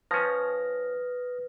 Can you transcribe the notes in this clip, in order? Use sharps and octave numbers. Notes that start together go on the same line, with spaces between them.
F3 C#4 B4 D#6 F6 A#6